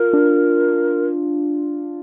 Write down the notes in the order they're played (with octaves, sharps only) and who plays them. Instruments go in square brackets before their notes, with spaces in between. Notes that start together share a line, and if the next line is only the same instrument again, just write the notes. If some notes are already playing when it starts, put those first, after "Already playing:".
Already playing: [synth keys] F4 [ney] A#4
[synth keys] D4